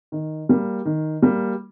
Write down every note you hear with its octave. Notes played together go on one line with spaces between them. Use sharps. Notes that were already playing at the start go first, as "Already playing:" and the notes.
D#3
G3 A#3
D#3
G3 A#3